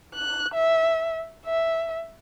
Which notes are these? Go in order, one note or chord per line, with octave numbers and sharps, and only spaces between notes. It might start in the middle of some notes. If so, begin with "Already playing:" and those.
F#6
E5
E5